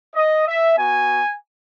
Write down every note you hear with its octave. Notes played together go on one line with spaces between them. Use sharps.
D#5
E5
B3 F#4 G#5